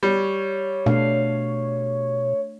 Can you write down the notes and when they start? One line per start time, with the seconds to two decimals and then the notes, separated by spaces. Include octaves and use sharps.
0.03 G3 C#5
0.86 B2 A3 D4 F5